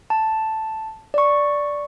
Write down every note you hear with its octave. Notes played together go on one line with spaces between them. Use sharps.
A5
D5 C#6